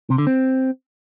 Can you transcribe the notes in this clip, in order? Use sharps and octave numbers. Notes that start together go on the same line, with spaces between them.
C3
D3
C4